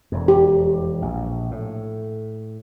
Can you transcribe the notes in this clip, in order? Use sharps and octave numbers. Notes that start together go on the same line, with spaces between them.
E1 F2
G4
A#1
A2